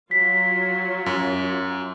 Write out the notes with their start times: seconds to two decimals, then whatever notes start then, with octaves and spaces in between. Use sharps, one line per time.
0.11 F#3 F4 B6
1.06 F#2